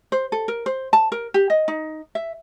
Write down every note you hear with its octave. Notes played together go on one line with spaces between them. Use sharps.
C5
A4
A#4
C5
A5
A#4
G4
D#5
D#4
E5